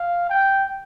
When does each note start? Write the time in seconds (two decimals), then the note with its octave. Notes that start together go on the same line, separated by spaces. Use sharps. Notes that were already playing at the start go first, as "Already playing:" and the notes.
Already playing: F5
0.29 G5